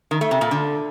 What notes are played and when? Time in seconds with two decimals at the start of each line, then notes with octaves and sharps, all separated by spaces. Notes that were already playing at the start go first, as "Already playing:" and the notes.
0.11 D#3
0.21 A3
0.31 C3
0.41 A#2
0.51 D3